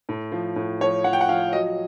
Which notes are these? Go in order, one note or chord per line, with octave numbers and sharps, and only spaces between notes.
A2
F3
A2
F3 C#5
F3 F#5
G5
F#5
F3 F5
F#3 D#5